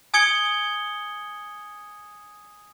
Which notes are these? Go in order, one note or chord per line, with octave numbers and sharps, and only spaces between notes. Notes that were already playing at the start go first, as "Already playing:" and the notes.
G#5 D#6 G#6 C#7 G7